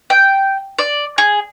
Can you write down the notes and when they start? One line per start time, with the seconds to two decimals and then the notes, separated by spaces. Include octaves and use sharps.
0.10 G5
0.79 D5
1.18 G#4